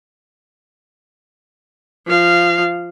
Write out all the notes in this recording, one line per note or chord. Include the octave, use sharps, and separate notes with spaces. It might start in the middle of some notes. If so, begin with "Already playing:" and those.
F3 F5